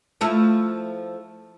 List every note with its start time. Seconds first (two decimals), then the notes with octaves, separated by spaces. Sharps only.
0.21 F3 A3 E4